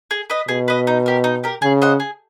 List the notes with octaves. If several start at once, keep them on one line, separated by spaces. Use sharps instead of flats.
G#4
B4 D#5
B2 G#4
B4 D#5
D#4
G4 A#4
D#4
G4 A#4
C#3 G#4
C5 D#5 F#5
G#4